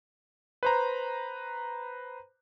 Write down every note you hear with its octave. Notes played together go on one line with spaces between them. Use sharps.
B4 C5 A#5